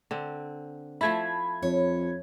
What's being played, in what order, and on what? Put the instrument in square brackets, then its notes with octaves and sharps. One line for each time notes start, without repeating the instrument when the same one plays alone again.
[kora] D3 C4
[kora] F3 A3 E4 [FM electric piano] B5 G#6
[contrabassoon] F2 [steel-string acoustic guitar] C#5